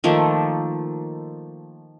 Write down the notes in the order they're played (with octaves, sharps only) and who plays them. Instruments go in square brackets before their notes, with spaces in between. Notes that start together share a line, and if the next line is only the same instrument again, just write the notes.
[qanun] D#3 F3 A3 A#3